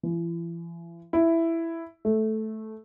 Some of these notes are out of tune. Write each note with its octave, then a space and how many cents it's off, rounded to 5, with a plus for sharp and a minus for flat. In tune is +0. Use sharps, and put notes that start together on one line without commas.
E3 +40
E4 +5
A3 -10